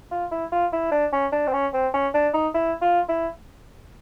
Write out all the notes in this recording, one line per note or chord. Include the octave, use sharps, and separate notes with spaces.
F4
E4
F4
E4
D4
C#4
D4
C4
C#4
C4
C#4
D4
D#4
E4
F4
E4